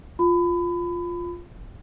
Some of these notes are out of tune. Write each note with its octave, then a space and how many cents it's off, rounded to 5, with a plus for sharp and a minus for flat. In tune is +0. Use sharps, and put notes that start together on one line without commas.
F4 +0 B5 +25